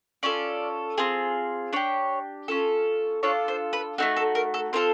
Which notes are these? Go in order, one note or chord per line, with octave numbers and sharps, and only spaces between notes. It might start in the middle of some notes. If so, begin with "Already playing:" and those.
C#4 F4 A4 D5
C4 F4 G#4
D4 G4 C#5
C#4 F4 A4
D4 F4 A4 C#5
C5
B4
A3 C4 D#4 F#4 A4
A4
A#4
A4
C4 F4 A4 A#4